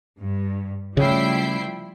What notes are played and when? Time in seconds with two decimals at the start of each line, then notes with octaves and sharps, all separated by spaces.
0.20 G2
0.97 C#3 F3 G3 A3 E4 G5 C7